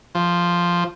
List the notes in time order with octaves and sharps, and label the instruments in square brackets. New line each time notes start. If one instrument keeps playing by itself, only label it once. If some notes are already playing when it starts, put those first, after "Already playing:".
[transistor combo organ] F3